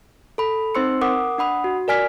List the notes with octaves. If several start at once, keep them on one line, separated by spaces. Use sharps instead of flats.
A4 B5
C4 D#4 C5 C6 E6 C#7
A#4 F#5 D6 D#6
D4 F#5 B5 D#6
F#4
A#4 D5 G#5 F6 B6